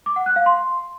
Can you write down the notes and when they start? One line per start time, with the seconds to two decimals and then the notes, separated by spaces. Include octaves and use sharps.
0.06 D6
0.16 F#5
0.26 F#6
0.36 F5
0.46 C6